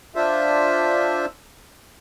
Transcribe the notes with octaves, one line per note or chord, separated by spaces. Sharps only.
D4 F4 C5 E5